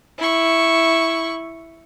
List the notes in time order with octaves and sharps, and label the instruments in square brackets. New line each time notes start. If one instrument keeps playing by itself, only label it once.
[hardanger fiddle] E4 C#6